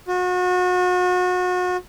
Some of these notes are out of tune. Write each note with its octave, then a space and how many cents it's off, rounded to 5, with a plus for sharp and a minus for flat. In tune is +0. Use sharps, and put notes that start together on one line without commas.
F#4 -35